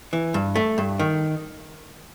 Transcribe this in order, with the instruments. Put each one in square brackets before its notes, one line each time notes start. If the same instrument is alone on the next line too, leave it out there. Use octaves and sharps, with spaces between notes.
[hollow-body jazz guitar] E3
G2
A3
G2
D#3